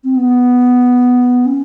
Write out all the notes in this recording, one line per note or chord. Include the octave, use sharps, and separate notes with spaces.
C4
B3
C#4